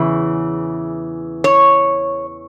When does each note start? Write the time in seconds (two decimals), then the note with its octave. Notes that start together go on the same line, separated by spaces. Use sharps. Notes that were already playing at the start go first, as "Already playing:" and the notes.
Already playing: E2 C#3 E3
1.44 C#5